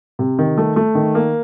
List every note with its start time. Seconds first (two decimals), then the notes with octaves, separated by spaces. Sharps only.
0.19 C3
0.39 D#3
0.58 A3
0.76 A3
0.95 D#3
1.15 A#3